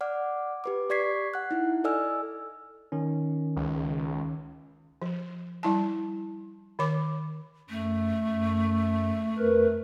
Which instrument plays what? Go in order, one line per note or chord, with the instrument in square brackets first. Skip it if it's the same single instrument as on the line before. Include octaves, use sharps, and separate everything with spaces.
[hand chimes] D5 F#5 D6 F6
G4 B4 D6
G4 D5 C#6 G#6 B6 C7
F#5 F#6
D#4 E4
A4 D5 D#5 G#5 E6 F6
[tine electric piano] D#3 C#4
[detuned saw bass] C#2
[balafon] F3
G3 E4 A5
D#3 C#5 D6
[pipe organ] F#2 [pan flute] A3
[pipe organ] F#2
F2 A#4 B4